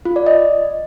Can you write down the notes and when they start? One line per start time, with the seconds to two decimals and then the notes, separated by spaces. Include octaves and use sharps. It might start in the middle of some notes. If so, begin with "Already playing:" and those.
0.05 F4
0.16 D5
0.26 D#5